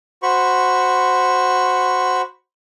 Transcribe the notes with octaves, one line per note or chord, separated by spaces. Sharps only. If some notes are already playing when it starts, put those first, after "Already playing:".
F#4 C5 B5 C#6